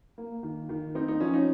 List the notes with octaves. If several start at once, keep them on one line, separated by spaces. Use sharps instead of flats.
A#3
D#3
D#3
C4 D#4
D#4
F3 C#4
D#4